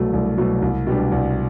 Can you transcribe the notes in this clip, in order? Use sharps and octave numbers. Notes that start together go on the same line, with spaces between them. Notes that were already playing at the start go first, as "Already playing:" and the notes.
Already playing: C2 B2 F#3 A3
C2
B2 F#3 A3
C2
B2 G3 D4 G4
C2